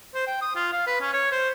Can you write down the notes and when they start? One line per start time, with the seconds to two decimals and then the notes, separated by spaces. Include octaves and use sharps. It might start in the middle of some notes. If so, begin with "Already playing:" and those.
0.15 C5
0.27 G5
0.42 D#6
0.56 F4
0.73 F5
0.87 B4
1.01 C#4
1.13 C#5
1.32 C5